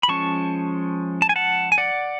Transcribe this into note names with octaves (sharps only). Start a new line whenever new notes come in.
B5
F3 G#3 C#4 A5 C#6
A5
G#5
F#5 A5
G#5
D5 F#5